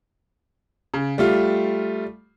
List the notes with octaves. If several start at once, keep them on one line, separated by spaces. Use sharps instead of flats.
C#3
G3 A3 F4